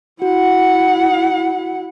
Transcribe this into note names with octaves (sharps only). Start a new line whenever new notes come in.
E4 F#4 F#5